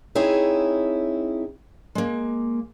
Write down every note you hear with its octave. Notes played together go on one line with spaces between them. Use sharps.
C4 D#4 E4 G#4 C#5
G#3 A#3